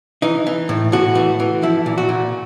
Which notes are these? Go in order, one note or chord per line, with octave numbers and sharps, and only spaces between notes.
E3 D#4
E3
A2
A2 F#4
E3
E3
F3 E4
A#2
F#4
A#2